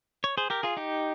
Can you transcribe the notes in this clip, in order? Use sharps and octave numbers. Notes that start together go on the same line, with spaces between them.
C#5
G#4 C5
G4 A#4
F4 G#4
D#4 G4